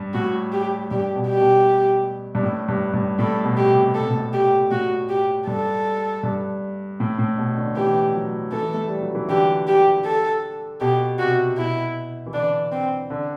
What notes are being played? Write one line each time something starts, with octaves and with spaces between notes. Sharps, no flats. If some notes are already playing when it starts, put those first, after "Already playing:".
Already playing: G2
A2 F#4
G4
G2 G4
B2
G4
B2
G2
A2
G2
G2
A2 A4
B2
G4
C3
C3 A4
B2
A2
B2
G4
A2 F#4
G4
G2 A4
G2
A2
A2
B2
D3
E3 G4
F#3
E3 A4
A3
G3
F#3
E3
D3 G4
G4
A4
B2 G4
C3 F#4
B2 E4
E3
D3 D4
C4
D3